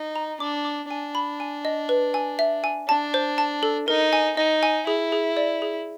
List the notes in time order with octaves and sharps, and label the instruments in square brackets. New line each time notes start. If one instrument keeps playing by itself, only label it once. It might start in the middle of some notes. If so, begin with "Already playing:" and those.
Already playing: [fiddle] D#4
[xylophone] A#5
[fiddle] D4 [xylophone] D6
[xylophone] D6
[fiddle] D4 [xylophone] G#5
[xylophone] B5
G#5
D#5
B4
G#5
E5
G#5
[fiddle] D4 [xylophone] A5
[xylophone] C5
A5
A4
[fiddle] D#4 [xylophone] A#4
[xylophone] G#5
[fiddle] D#4 [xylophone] D#5
[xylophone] G#5
[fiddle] E4 [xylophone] G#4
[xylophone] G#4
D5
G#4